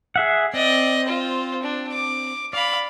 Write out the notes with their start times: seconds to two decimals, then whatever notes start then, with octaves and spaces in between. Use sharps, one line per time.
0.16 G#4 E5 F#5
0.54 C4 D5 D#5
1.05 F4 C5
1.62 D4
1.92 D6
2.53 D5 F5 B5